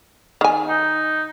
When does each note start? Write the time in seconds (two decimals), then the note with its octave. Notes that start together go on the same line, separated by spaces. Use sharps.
0.41 D#3 G#5
0.68 D#4